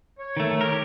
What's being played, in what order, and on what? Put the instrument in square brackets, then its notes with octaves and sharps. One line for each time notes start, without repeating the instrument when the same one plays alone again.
[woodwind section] C#5
[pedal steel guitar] D#3 A3
G4 A#4